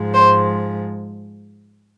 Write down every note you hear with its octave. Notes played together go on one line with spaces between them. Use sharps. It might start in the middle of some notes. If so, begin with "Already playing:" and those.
Already playing: G#2 F3 G#3
C5